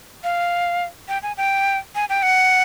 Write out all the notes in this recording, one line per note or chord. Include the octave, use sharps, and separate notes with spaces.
F5
G5
G#5
G5
G#5
G5
F#5